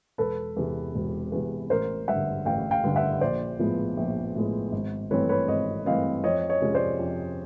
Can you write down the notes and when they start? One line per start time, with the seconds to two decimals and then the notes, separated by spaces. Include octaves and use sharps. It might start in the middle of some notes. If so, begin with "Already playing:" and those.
0.18 E1 A4 B4
0.56 E2 C3
0.95 E1
1.32 E2 C3
1.70 A1 A#4 C5
2.08 G2 D3 E5 F#5
2.45 A1 F5 G5
2.71 F5 G5
2.84 G2 D3
2.96 E5 F#5
3.21 A#1 C5 D5
3.59 A2 F3 G#3 B3
3.97 A#1
4.35 A2 F3 G#3 B3
4.72 G#1
5.11 G2 E3 A3 C4 B4 C#5
5.29 B4 C#5
5.48 G#1 C#5 D#5
5.86 G2 E3 A3 C4 D#5 F5
6.24 F2 C#5 D#5
6.49 C#5 D#5
6.62 C3 F3 G#3 C#4
6.75 C5 D5
6.99 F2